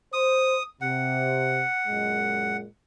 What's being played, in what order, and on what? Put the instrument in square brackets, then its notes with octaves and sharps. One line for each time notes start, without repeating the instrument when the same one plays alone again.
[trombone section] C5 [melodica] D#6
[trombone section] C3 [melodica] F#5
[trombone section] F#2 A#2 G#3